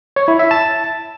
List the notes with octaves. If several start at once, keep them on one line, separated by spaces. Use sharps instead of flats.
C#5
E4
E5
A5